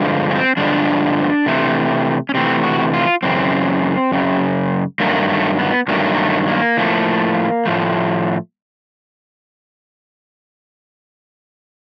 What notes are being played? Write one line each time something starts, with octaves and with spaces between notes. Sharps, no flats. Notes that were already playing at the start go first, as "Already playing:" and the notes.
Already playing: G2 D3 F3 G#3
C#4
C4
G2 D3 F3 G#3 D4
C3 E3 A3
C#4
C3 E3 A3 C4
F#4
F4
F#2 C#3 E3 C4
F#2 C#3
G2 D#3 F#3 A3 A#3
A3
B3
G2 D#3 F#3 A3 A#3
A#3
A3
A#3
A2 F3 A3
A2 F3 A3